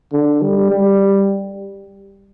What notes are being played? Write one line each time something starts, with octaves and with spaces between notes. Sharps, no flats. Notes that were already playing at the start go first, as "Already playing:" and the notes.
D3
G3
G3